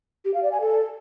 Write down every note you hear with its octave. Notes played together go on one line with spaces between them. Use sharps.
G4
F5
D5
G#5
A4